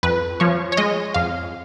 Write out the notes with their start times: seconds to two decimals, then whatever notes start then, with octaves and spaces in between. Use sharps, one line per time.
0.03 F2 B4
0.40 F3 C#5
0.72 C#5
0.77 G#3 D#5
1.14 F2 F5